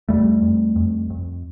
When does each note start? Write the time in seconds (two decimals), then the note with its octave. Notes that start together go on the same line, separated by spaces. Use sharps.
0.09 F2 G3 A3
0.42 F2
0.76 F2
1.10 F2